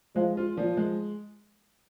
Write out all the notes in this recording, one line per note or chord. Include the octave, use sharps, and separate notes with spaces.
F3 G#3
F4
A#2 F3
G#3